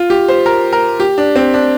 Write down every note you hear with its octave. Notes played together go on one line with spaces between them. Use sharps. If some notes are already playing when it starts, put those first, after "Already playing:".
Already playing: F4
G4
C5
A#4
A#4
G4
D4
C4
D4